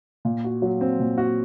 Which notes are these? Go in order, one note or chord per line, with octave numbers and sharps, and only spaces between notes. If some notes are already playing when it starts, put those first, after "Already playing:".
A#2
F#4
F#3
C4
A#2
F#4